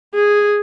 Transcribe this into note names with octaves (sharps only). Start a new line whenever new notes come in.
G#4